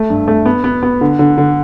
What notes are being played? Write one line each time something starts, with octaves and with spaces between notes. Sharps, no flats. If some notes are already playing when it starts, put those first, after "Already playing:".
Already playing: A3
G2
A3
B3
B3
B3
D3
D3
D3